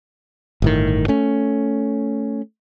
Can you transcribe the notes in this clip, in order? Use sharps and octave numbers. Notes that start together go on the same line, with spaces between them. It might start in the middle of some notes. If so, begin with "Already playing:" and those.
G1 A2 D#3
A3 C#4